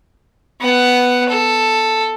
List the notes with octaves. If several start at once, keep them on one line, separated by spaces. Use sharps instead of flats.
B3 F#5
A4